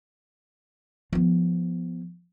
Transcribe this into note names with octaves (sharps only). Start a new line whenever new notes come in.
F3 B3